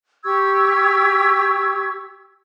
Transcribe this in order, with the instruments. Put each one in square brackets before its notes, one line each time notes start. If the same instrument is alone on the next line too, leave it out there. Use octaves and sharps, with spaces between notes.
[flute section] G4 C#6 E6 G#6